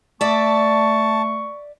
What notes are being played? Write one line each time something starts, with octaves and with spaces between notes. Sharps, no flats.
A3 D5 E5 A5 C#6